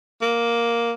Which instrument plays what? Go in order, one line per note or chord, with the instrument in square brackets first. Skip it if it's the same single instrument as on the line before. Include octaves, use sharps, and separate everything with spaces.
[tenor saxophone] A#3